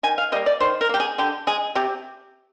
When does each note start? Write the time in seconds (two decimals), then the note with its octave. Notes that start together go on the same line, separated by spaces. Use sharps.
0.03 D#3 G#5
0.18 F5
0.32 G3 D#5
0.35 A#3
0.46 D5
0.60 D#3 C5
0.81 A#4
0.89 A#3 G4
1.00 G#4
1.18 D3 G4
1.47 G#3 G#4
1.75 C3 G4